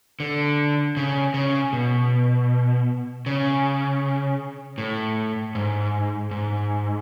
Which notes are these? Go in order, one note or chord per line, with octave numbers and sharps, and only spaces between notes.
D3
C#3
C#3
B2
C#3
A2
G#2
G#2